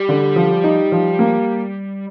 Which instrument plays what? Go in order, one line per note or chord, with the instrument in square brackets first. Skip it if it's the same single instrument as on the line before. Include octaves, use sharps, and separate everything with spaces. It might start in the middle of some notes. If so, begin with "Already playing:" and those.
Already playing: [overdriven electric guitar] G3
[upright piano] D3
F3
D#4
F3
A#3